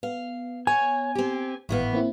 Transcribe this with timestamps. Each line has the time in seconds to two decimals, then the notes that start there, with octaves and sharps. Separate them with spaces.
0.03 B3 F5
0.67 C#5 F#5 G#5
1.15 C4 G4
1.69 G#1 A2 E3 B3 F5
1.93 A#3 C4 E4